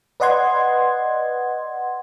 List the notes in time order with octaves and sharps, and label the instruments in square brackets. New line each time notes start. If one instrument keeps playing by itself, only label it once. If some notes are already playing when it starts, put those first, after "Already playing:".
[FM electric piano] B4 D5 D#5 F#5 C6 G#6